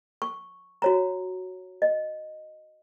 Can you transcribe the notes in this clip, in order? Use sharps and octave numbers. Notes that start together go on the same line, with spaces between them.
C#6
F#4 C#5 A#5
D#5